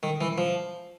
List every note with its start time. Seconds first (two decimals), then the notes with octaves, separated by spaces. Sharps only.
0.03 D#3
0.21 E3
0.38 F3